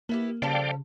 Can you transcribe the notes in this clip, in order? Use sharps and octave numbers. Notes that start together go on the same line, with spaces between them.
A#3 B3 E4 G4
C#3 F3 G3 A4 D5 F5 G5